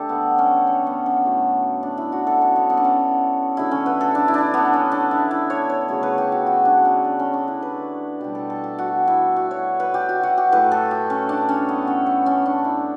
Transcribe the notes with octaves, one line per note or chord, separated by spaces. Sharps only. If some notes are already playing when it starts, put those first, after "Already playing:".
Already playing: D3 A3 G4 A4
B3
C#4
C#4
B3
C#4
A2 F#3 A3
D4
E4
F#4
A4
C#4
B3
B3
D4
C#4
D3 F#3 A3 E4
C#4
B4
A4
D4
E4
D4
B3
C#4
D4
E4
E4
C#5
C#5
C#3 F#3 A3 C#5
B4
G4
F#4
F#4
D4
C#4
D4
C#4
D4
E4
B4
B2 G3 G4
A4
A4
G4
F#4
E4
F#4
C#5
B4
G4
F#4
F#4
G4
A2 F#3 A3 B4
A4
G4
C#4
D4
C#4
B3
C#4
B3
C#4
D4
E4